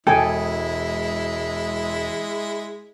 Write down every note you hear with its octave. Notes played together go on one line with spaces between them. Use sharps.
E1 G#3 E4 A4 G5 G#5 D#6